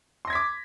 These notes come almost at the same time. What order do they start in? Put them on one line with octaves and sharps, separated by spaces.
C6 A#6 G#6 B6 D6